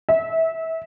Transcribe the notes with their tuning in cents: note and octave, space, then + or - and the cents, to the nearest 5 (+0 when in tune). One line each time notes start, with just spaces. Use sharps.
E5 -25